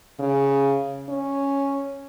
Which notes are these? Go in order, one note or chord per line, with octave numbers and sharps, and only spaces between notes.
C#3
C#4